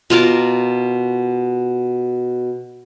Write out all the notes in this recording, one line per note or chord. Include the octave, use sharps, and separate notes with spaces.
B2 F4 A#4 D6